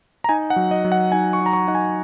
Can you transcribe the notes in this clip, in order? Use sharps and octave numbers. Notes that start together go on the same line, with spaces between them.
A#5
D#4 G#5
F#5
F#3
D#5
F#3
F#5
D#4 G#5
C#6
D#4
A#5
C#6
D#4 F#5
G#5